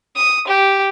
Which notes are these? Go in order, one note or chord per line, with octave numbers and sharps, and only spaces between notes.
D#6
G4